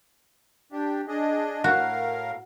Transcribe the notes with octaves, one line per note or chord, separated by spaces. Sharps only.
D4 G4
D4 G#4 D#5
A2 F#4 A#4 F5